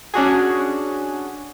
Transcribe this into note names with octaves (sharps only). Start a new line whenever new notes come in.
C#4 D4 F#4 G#4